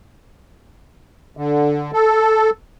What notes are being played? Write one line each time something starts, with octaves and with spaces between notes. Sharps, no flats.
D3
A4